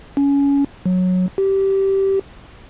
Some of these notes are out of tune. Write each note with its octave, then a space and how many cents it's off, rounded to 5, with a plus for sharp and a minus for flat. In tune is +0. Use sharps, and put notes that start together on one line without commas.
C#4 +20
F#3 -15
G4 -15